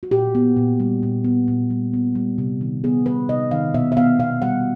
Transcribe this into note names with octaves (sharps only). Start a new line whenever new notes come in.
F#4
A#2 G4
B3
A#2
G3
A#2
B3
A#2
G3
B3
G3
C3
D#3
B3 G#4
G3 B4
C3 D#5
D#3 F5
B2 E5
E5
B3 F5
B2 F5
G3 F#5